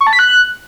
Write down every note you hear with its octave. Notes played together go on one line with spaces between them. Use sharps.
C#6
A5
B6
F#6